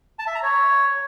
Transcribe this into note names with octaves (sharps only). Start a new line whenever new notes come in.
A5
E5
A#5
C#5